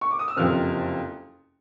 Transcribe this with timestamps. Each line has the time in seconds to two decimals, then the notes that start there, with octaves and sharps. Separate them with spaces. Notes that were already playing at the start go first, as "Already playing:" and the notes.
0.01 C#6
0.11 D6
0.19 D#6
0.28 E6
0.37 F#1 F2 C3 F6